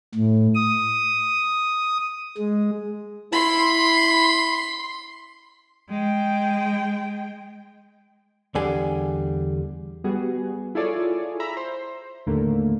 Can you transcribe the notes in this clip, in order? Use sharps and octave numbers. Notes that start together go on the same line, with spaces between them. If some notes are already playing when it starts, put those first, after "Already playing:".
A2
D#6
G#3
E4 B5 C6
G#3 G5
E2 D3 G3 G4 G#4 G#5
G3 B3 F#4 G#4
E4 F4 G#4 A4 C#5 D5
E5 A#5 B5
C5
D#2 A2 D3 A3 A#3